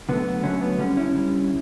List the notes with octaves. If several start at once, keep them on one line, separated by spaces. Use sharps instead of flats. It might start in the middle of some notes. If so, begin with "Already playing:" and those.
D3 F#3 A3 B3
D3 F#3 A3 C#4
B3
D3 G3 C#4
C#4 E4
D3 G3